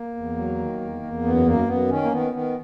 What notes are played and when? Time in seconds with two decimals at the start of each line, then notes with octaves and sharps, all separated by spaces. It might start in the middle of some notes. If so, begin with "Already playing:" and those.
Already playing: A#3
0.15 E2
0.36 F#3
0.58 D#3
0.81 E2
1.03 E2
1.23 F#2 B3
1.46 F#2 A#3
1.67 F#2 B3
1.89 D#3 C#4
2.03 A#3
2.11 D#3 B3
2.33 D#3 B3